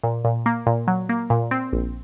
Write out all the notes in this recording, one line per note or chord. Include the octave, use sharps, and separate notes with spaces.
A#2
A#2
A#3
A#2
F#3
A#3
A#2
C4
A#1